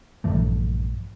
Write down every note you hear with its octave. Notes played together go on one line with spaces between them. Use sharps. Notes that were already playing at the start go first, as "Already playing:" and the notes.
A#1 G2 E3 A3